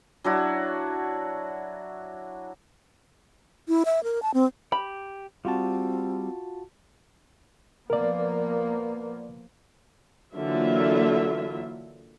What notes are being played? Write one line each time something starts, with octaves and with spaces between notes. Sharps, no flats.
F#3 D4 E4 F#4
E4
E5
A#4
A5
C4
G4 B5
G3 C4 F4 F#4 A5
F3 A#3 B3 A#4 D5
D3 E3 F#3 A#3 F4 E5